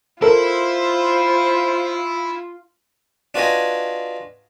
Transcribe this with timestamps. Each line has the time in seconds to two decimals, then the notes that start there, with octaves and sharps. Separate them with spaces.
0.22 E4 F4 A4 A#4 C5
3.34 D4 F4 F#4 B4 D#5 G#5